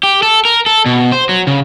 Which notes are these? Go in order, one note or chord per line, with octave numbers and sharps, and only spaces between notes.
G4
A4
A#4
A4
B2
C5
F#3
C#3